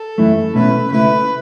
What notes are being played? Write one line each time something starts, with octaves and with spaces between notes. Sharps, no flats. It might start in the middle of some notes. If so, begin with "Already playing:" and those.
Already playing: A4
F#2 E3 A3 E4
B2 A3 C#4 E4 B4
C#3 A3 E4 B4